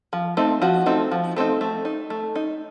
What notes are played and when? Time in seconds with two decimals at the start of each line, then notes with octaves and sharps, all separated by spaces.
0.13 F3
0.37 A3 C4 D#4
0.62 F3 F#4
0.86 A3 C4 D#4
1.11 F3
1.36 A3 C4 D#4
1.61 A3
1.85 D#4
2.10 A3
2.36 D#4